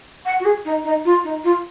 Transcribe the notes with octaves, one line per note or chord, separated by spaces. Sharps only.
F#5
F#4
G#4
D#4
D#4
F4
D#4
F4